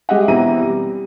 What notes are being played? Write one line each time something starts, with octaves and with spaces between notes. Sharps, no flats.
G#3 G4 D#5 E5 F#5
B2 E3 C4 A#5 D#7
G3